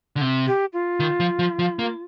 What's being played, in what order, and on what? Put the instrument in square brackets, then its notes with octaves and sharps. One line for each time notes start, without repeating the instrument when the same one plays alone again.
[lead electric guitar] D3
C3
[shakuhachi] G4
F4
[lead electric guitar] D#3
F3
F3
F3
A#3